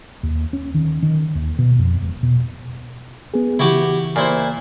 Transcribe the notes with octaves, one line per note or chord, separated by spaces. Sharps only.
D#2
C#4
D#3
D#3
D#2
B2
F2
E1
B2
B3 G#4
C#3 E3 E4 F#4 G4
A#2 E4 C5